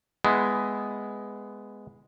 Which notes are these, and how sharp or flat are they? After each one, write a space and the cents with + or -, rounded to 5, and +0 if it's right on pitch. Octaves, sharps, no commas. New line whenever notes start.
G#3 +0 B3 +10 E4 +0